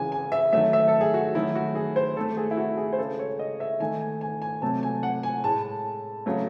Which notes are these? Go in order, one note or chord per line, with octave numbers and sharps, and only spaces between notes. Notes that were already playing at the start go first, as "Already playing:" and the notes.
Already playing: C#3 E3 G#3 G#5
G#5
E5
D#3 F#3 A3 E5
E5
A4
G#4
F#4
D#3 F#3 A3 E4
F#4
G#4
C5
D#3 A3 A4
G#4
E4
F#4
G#4
C5
C#3 G#3 A4
C#5
D#5
E5
D#3 A3 G#5
G#5
G#5
G#5
C3 F#3 A3 A5
G#5
F#5
G#5
A2 G#3 A5
C#3 F#3 A3